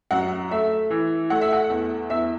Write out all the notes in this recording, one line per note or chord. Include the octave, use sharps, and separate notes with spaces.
F#2 F#5
A3 E5
E3
A3 F#5
E5
F#5
E2
E2 E5